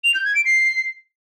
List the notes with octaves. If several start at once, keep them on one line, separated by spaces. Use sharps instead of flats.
F7
G6
G#6
D7
C7